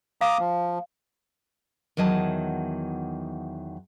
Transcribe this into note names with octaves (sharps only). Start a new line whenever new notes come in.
F5 A#5 D6 D#6
F3
E2 D#3 F#3 D#5 A5